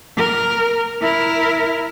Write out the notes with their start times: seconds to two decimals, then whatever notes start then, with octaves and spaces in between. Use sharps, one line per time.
0.17 A#4
1.01 E4 A#4